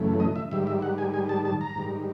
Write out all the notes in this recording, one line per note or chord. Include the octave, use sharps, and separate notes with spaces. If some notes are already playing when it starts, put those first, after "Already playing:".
Already playing: F#2 C#3 E3 A3
D#5
E5
G#2 D#3 G3 E5
E5
F#5
G#5
G#5
A5
A5
A#5
G#2 D#3 G3